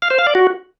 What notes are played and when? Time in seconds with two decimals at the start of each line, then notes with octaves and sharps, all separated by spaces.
0.02 F5
0.10 C5
0.19 F5
0.27 D5
0.35 F#4